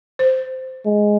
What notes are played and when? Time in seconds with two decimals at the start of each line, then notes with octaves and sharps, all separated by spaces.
0.19 C5
0.86 G#3